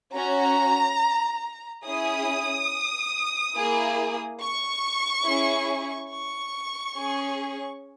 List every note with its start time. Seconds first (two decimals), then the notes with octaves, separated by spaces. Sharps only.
0.15 C#4 F#4 A#5
1.86 C#4 E4 G#4 D#6
3.57 A#3 E4 G#4
4.41 C#6
5.27 C#4 E4 G#4
6.12 C#6
6.97 C#4 G#4